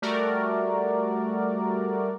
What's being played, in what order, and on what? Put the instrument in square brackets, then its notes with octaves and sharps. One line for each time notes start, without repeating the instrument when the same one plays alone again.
[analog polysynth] G3 A3 F#4 A#4 D5